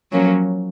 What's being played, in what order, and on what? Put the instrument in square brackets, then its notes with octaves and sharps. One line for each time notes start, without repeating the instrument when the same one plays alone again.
[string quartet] F3 A#3 C#4 [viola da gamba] F#3